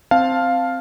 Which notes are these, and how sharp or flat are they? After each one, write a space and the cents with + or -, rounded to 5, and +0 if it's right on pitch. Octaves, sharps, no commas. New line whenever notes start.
C4 +0 F5 +5 A5 +0